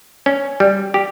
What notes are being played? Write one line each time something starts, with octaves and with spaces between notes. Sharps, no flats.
C#4
G3
G4